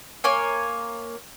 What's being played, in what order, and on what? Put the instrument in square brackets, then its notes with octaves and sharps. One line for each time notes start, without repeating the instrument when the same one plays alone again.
[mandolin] A#3 C#5 G#5